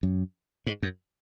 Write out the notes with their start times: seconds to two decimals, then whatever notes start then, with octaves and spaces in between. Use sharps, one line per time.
0.03 F#2
0.67 G#2
0.83 F#2